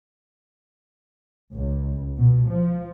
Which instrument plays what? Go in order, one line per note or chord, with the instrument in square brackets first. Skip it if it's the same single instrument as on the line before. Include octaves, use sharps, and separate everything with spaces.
[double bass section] C#2
B2
F3